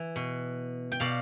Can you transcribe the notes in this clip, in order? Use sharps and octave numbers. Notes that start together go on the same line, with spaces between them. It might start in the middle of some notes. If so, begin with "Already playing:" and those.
Already playing: E3
B2
G5
B2 D5 F5